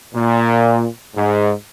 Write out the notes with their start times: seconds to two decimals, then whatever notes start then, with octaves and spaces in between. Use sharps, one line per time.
0.14 A#2
1.15 G#2